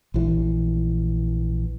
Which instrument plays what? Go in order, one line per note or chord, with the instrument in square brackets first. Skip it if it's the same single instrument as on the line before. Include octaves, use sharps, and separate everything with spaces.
[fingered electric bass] A#1 E3